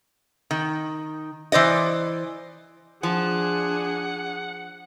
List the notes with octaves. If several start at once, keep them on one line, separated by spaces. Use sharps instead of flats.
D#3
E3 C5 D5 D#5
F3 D4 G#4 F#5